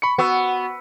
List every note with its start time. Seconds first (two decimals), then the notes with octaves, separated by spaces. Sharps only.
0.02 B5 C#6 C#7
0.18 B3 F#4 C#6 E6